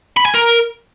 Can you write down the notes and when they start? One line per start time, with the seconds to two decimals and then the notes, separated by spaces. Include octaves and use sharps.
0.17 B5
0.25 G#5
0.34 A#4